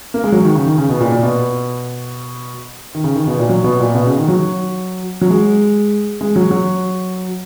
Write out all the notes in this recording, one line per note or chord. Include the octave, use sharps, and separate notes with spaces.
A#3
G#3
F#3
D#3
C#3
D#3
C#3
B2
A#2
A#2
B2
D#3
C#3
D#3
B2
A#2
F#3
B2
A#2
B2
C#3
D#3
F#3
F#3
G#3
G#3
F#3
F#3